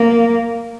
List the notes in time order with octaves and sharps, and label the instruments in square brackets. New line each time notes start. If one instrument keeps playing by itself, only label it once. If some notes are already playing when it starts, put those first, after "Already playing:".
Already playing: [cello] A#3